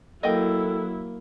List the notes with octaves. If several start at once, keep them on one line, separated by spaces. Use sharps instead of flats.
F#3 A#3 E4 A4 D#5 G5